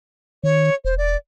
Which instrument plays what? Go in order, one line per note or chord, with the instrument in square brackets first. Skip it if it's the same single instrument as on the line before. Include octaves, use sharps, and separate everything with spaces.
[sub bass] D#3 [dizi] C#5
[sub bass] E1 [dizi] C5
[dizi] D5